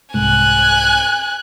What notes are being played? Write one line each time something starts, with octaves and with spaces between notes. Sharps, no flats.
C2 G#2 G#5 F#6